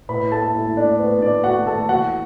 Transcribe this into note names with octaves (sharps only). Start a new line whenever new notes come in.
A2 B4 B5
A3 A4 A5
A3 E4 E5
A3 D4 D5
A3 B3 B4
A3 D4 D5
A3 F#4 F#5
A3 A4 A5
E2 F#4 F#5